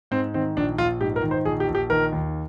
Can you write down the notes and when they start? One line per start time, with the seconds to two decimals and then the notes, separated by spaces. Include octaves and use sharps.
0.11 G#2 C4
0.34 D#3 C4
0.57 A#1 D4
0.78 A#1 F4
1.01 G#2 G4
1.16 A#4
1.23 D#3
1.31 C5
1.45 A#1 G#4
1.60 G4
1.68 A#1
1.75 G4
1.90 D#3 A#4
2.12 D#2